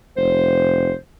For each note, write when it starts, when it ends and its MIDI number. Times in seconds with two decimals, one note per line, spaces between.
0.17 0.91 29
0.17 0.93 72